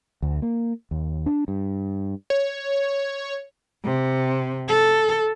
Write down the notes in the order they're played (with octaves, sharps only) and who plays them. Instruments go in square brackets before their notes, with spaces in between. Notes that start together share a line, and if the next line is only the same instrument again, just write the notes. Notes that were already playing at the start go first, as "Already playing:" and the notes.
[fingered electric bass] D2
A#3
D#2
D4
G2
[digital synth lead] C#5
[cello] C3
A4